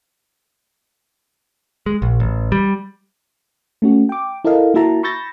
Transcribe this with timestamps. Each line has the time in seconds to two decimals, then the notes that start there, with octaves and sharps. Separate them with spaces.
1.86 G#3
2.02 A#1
2.20 A1
2.52 G3
3.82 A3 C#4 F#4
4.09 G5 D6
4.44 E4 A4 A#4 D#5 F5
4.74 A#3 E4 F#4 E5 A5 A#5
5.03 B5 C#6 E6 G6 A6 A#6